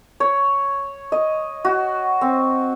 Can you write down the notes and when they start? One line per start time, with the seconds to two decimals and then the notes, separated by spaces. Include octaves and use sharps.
0.20 C#5
1.12 D#5
1.65 F#4
2.21 C4